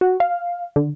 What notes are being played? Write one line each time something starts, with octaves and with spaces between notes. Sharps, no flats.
F#4
F5
D3